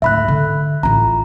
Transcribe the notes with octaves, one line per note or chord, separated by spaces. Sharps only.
D2 G#2 E5 B5 F#6
D3
A1 F4 A#5